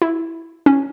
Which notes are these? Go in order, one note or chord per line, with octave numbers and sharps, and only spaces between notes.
E4
C#4